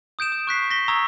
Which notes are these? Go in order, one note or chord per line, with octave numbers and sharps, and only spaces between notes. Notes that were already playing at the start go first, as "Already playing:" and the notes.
D#6 G6 D7 E7
D#6
C#6 F#6 B6 C7
A#6 B6 G7
A#5 C#6 D#6 E6 G#6